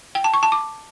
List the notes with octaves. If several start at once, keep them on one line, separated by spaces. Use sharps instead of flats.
G5
A5
C#6
A5
D6